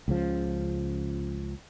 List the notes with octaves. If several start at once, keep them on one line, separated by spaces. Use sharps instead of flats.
C#2 C#3 F3